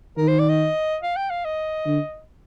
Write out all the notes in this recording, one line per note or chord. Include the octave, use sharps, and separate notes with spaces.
D#3 A#4
C5
D5
D#5
F5
G5
F5
D#5
D3